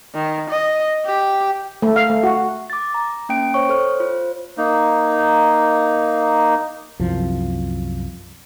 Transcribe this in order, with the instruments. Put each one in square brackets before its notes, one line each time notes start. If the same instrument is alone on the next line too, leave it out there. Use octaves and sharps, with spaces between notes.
[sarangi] D#3
D#5
G4
[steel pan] A3
F5
A3
F#4
[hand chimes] D6 A6
A#5
A#3 C#4 G5 D7
C5 C#5 C#6
A4 C5 C#5 F6
F4 C5
[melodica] A#3 D#4
[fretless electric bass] C2 F#2 F3